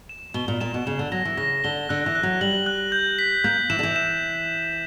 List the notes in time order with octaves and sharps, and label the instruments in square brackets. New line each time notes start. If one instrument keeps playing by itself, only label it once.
[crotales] E7
[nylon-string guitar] B2 [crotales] G7
[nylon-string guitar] A#2
[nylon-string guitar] A#2 [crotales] E7
[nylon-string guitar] B2
[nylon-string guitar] C#3 [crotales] E7
[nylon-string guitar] D3
[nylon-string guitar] F#3 [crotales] A#6
[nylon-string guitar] E3
[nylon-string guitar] C#3 [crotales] A#6
[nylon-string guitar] D3 [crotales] G7
[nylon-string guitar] D3 [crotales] F#6
[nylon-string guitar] E3
[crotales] F#6
[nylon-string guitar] F#3
[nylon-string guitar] G3 [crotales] F#7
[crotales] F#6
G6
B6
[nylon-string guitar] A#3 [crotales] G6
[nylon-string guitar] E3 [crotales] E7
[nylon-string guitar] D3
E3
[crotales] E7